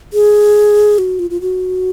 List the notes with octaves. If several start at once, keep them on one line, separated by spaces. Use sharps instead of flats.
G#4
F#4
F4
F4
F#4